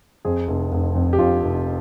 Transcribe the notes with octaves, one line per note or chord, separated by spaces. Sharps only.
F2 G#4
F1
F1
F2
G4
F2 F4
F1